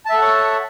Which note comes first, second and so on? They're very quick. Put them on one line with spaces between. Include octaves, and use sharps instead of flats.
A5 E5 A4 F#5 C#5